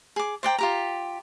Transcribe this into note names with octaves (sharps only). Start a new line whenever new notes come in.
G#4 D6
C5 D5 G5 A#5
F4 G4 A#5